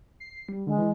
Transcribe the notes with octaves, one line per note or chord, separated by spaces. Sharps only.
C7
G3
D3 G#3
E3